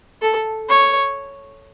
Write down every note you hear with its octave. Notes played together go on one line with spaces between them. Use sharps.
A4
C#5